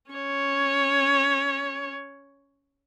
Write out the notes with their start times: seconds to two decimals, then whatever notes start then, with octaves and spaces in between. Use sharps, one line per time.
0.11 C#4 C#5